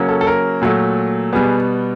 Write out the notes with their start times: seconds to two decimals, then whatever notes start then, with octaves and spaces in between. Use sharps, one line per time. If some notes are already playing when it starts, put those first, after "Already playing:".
Already playing: C#3 F#3 A#3 C#4
0.08 A4
0.21 A4
0.27 A#4
0.62 A#2 F#3 A3
1.33 B2 G3 B3 G#4